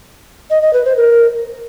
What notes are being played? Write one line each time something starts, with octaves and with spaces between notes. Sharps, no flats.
D#5
D#5
B4
C5
A#4